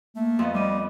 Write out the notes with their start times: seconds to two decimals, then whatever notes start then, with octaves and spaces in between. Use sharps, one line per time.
0.16 A3 A#3
0.39 F2 B3 D#5 F5 C6
0.54 G3 D#5 B5 D6 D#7